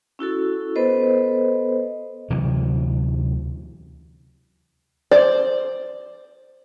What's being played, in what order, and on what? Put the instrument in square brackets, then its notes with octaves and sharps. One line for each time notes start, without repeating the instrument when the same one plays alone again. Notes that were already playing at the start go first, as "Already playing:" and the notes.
[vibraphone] C#4 E4 F#4 A4
B3 A4 B4 C5 D#5
[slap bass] D2 C3 E3 F#3
[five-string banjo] C5 D5